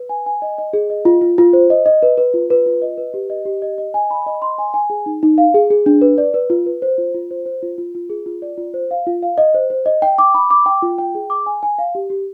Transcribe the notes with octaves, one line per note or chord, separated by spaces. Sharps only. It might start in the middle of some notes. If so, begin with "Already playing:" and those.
Already playing: B4
G#5
G#5
D#5
D#5
G#4
D#5
F4
F4
F4
C5
D#5
D#5
B4
B4
F4
B4
F4
D#5
B4
G4
D#5
G4
D#5
D#5
G#5
B5
D#5
C6
G#5
G#5
G#4
D#4
D#4
F5
G#4
G#4
D4
B4
D5
B4
F4
B4
C5
F4
F4
C5
C5
F4
F4
F4
G#4
F4
D5
F4
C5
F5
F4
F5
D#5
C5
C5
D#5
G5
D6
B5
D6
G5
F4
G5
G#4
D6
G#5
G#5
F5
G4
G4